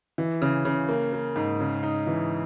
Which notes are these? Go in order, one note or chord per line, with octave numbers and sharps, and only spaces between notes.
E3
C#3
C#3
A#3
A#3
G#2
C#3
D#4
E3